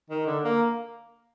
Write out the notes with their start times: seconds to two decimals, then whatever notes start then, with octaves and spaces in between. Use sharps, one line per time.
0.10 D#3
0.27 D3
0.44 A#3